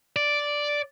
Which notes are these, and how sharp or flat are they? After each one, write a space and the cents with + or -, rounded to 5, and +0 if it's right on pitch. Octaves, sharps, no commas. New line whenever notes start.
D5 -5